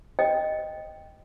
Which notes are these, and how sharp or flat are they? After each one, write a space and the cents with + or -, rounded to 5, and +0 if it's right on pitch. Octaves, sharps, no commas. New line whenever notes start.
D#5 +0 G5 +5